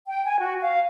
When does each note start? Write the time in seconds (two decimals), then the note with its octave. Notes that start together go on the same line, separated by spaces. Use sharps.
0.07 G5
0.25 G#5
0.40 F#4
0.61 F5